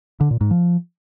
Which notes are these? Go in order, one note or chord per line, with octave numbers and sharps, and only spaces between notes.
D3
A#2
G#2
F3